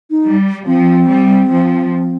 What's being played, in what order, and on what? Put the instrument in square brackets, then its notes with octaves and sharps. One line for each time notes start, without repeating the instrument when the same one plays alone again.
[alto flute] D#4
[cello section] G3
[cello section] F3 [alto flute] C4
[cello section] G3
F3